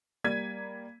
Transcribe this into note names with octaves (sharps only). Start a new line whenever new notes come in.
G3 A#3 G#6 B6 D#7